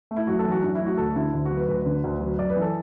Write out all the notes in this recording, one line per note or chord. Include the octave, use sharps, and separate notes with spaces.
A3
E4
F#2 F#4
A4
E3
F#4
F#2 D4
E4
A3
F#4
D2 A4
D3 E4
D2
F#4
F#3
B4
D2 B4
D3
D2
F#3
F#2 D5
B4
E3
A4